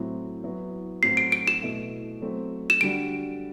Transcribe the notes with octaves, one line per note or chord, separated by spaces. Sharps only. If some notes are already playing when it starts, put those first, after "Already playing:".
Already playing: A2 F#3 C4 E4
F#3 B3 E4
A2 F#3 C4 F#4 C7
D7
D7
E7
B2 A3 E4
F#3 A3 C4
E7
D3 G3 D4 F#4 D7